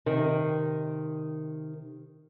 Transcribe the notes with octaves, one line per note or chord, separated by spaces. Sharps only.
C3 D#3